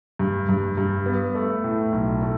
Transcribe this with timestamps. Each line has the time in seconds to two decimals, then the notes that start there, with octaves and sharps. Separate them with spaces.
0.19 G2
0.49 G2
0.77 G2
1.06 B3
1.35 A3
1.64 A2
1.92 B1
2.22 A3